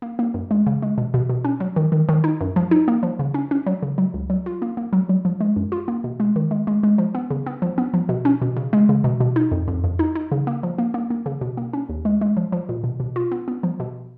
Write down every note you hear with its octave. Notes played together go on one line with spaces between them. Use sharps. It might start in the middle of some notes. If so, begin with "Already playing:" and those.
A#3
A#3
F#2
G#3
C#3
G#3
B2
B2
B2
C#4
F#3
D#3
D#3
D#3
D#4
F#2
F3
D#4
A#3
F3
C#3
C#4
C#4
F#3
C#3
F#3
C#2
F#3
F4
A#3
A#3
F#3
F#3
F3
G#3
F#2
F4
A#3
B2
G#3
D#3
G#3
G#3
G#3
F3
B3
C#3
B3
F3
B3
F3
B2
C#4
B2
C#3
G#3
C#3
B2
B2
D#4
F2
F2
F2
D#4
D#4
C#3
A#3
F3
A#3
A#3
A#3
C#3
B2
A#3
C#4
D#2
G#3
G#3
F3
F3
A#2
B2
B2
F4
B3
B3
F3
B2